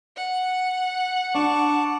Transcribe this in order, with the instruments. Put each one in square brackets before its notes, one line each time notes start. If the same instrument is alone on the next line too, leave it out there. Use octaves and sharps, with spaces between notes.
[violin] F#5
[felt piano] D4 [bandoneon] A5 C#6 D6